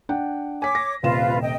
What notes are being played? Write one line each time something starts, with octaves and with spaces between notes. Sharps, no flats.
D4 F#5 G5
C#5 G#5 D6 B6
A#6
D#1 C3 F4 B4 E7
D#5 G5